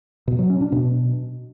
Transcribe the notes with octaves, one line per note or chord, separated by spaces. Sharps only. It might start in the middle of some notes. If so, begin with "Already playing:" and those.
B2
F#3
C#4
D4
B2